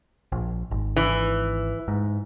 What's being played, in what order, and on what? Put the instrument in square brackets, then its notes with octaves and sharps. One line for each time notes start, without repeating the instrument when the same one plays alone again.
[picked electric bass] A#1
G#1
[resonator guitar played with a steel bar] E3
[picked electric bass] G#2